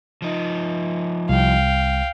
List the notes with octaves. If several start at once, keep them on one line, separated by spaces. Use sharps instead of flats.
F3 D#4
C2 F5 G5